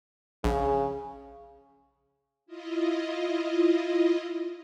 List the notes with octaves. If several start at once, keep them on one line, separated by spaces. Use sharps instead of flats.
A#1 C#3
E4 F4 D#5